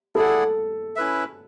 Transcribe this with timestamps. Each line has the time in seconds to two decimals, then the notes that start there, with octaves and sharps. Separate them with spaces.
0.15 E4 G#4 A4 D5 F#5
0.96 C#4 E4 B4 E5